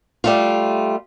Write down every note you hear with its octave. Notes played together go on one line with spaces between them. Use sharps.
G3 A3 F4